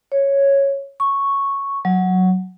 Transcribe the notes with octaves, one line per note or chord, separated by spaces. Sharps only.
C#5
C#6
F#3